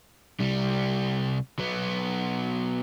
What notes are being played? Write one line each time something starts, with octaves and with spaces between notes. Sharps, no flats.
C2 G3
F#3 B3